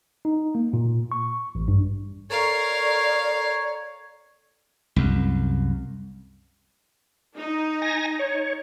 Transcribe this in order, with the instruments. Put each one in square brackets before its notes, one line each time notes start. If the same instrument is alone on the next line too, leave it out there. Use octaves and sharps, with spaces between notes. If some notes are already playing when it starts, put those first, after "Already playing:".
[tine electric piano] D#4
A#3
A#2
C#6
A1
G2
[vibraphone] A4 A#5 C#6 [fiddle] A#4 F5 [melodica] C#5 [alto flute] D5
[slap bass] C2 F#2
[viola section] D#4
[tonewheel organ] G#5 A#6
C#5